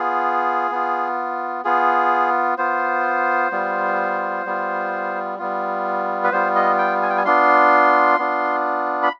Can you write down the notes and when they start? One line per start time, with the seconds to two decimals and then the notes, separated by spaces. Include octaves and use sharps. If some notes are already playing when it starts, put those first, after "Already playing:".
Already playing: B3 F4 G#4
0.71 B3 F4
1.64 B3 F4 G#4
2.58 B3 F4 C5
3.51 G3 B3 F4
4.45 G3 B3 F4
5.38 G3 B3 F4
6.24 B4
6.32 G3 B3 F4 C5
6.56 D#5
6.78 G5
7.03 G#5
7.10 G5
7.17 G#5
7.25 B3 D4 F4 C6
8.19 B3 D4 F4
9.03 B5